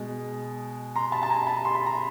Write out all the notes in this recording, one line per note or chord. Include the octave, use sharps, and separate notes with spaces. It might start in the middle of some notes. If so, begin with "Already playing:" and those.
Already playing: B2 G#3
A#5 C6
A5 B5
A5
G#5 A#5
A5 B5
C6
B5
A#5